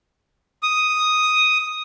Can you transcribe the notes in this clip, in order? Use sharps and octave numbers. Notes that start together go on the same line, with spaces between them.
D#6